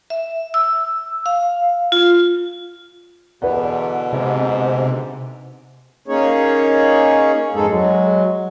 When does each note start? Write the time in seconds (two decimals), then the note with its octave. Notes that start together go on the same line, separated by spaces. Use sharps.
0.10 E5
0.54 E6
1.26 F5
1.92 F4
3.42 E2 B2 D3 B4 D5 F#5
4.13 G#2 C3
6.08 A#3 C#4 D#4 G#4 C#5
7.54 F2 G#2 G#3 D#4 G#4 A4
7.67 F#3 G#3